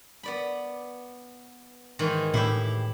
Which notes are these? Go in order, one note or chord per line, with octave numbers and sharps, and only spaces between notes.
B3 D5 B5
G#2 D#3 E3
A2 E4 G4